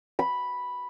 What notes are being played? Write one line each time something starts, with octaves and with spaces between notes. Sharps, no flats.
B5